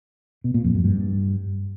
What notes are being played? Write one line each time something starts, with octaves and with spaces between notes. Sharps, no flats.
B2
A#2
F2
F#2
G2